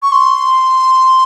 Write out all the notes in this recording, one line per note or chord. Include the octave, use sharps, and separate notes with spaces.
C#6
C6